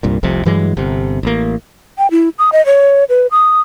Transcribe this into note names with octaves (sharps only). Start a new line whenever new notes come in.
C2 G2 A#2
F1 C2 F2 C3
G2 E3 F#3 G#3
G1 C3
A1 A#3
G5
E4
D#6
D#5
C#5
B4
D#6